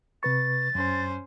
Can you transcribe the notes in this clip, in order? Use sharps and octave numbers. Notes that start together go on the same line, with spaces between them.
C3 B4 C#6 A6
F#2 C#4 C5